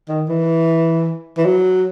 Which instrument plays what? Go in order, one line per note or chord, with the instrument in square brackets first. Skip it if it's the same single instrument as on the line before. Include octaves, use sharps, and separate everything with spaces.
[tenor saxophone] D#3
E3
E3
F#3